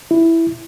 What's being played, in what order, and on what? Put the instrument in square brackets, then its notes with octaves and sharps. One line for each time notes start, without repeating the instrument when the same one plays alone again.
[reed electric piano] E4